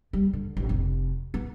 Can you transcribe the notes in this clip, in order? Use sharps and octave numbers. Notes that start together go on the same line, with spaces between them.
G3
D3
A1
F1
B3